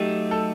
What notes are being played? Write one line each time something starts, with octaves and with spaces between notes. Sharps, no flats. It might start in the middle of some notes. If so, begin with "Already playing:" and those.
Already playing: F#3 A3 D#4 G4
A4